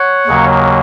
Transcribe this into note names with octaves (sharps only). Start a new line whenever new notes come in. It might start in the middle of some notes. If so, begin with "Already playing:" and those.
Already playing: C#5 F#5
D#2 C#3 F#3 A#3